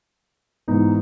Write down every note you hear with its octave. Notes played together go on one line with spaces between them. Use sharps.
G#2 E3 B3 D#4